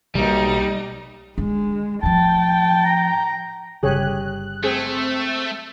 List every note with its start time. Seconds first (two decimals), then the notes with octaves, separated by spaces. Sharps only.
0.15 B1 B2 G3 A#3 D#4
1.38 D3 G#3
2.03 A2 F3 G5 A5
2.85 A#5
3.83 G1 C#3 G3 G4 G#4 C#5 F#6
4.64 A3 C4 G#4